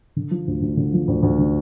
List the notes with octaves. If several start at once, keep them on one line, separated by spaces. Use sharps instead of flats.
D3
F3
D2
D2
D3
F3
D2
D2
D3